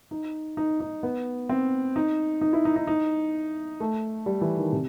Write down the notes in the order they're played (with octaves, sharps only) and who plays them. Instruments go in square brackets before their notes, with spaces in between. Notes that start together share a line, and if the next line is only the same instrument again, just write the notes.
[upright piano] D#4
D#4
D#4
B3
C4
D#4
D#4
E4
D#4
D#4
D#4
A3
G3
E3
D#3
C3